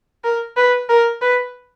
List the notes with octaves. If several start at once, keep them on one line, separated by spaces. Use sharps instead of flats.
A#4
B4
A#4
B4